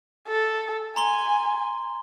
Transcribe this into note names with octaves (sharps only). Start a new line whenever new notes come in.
A4
G#5 A#5 C6 G7